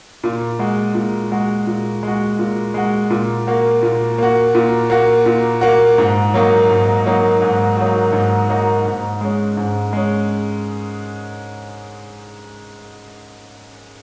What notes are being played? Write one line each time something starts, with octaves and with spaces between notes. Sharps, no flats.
A#2
G#3 F#4
A#2
G#3 F#4
A#2
G#3 F#4
A#2
G#3 F#4
A#2
A#3 F#4
A#2
A#3 F#4
A#2
A#3 F#4
A#2
A#3 F#4
G#2
F#3 A#3 D#4 F#4
G#2
F#3 A#3 D#4 F#4
G#2
F#3 A#3 D#4 F#4
G#2
F#3 A#3 D#4 F#4
G#2
G#3 C#4
G#2
G#3 C#4